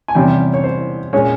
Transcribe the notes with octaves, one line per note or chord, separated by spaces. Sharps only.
G#5
E2 C3 G3 C#4 G5
C#5
C5
A#2 G#3 C#4 C#5